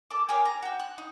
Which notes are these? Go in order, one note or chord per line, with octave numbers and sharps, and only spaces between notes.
A4 D6
G4 G#4 A#4 C#5
A#5
F#4 G5
F#6
D#4